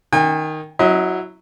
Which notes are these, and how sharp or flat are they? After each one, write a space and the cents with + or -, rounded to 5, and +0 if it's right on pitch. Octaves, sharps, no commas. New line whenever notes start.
D#3 +0 G#5 -45
F#3 +0 E4 +0 D#5 +35